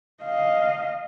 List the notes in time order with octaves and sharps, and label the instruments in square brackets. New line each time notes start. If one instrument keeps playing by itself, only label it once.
[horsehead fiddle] D#5 F5